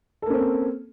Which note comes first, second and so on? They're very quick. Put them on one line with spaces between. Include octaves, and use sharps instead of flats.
A4 A#3 C#4 C4